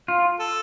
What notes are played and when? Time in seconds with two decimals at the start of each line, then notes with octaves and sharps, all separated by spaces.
0.08 F4
0.40 A4